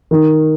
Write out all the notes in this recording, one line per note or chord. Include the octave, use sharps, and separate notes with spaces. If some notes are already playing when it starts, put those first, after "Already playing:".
D#3